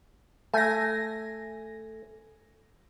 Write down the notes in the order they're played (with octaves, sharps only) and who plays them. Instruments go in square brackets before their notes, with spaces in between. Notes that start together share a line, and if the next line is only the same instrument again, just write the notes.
[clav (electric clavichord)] A3 [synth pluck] G#5 A#6